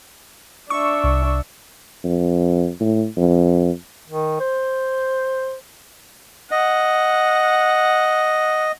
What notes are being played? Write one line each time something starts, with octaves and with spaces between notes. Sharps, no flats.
D4 E5 C#6
C2
F2
A2
F2
D#3
C5
D#5 F#5